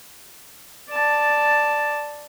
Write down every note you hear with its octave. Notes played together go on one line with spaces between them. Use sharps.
D5 A5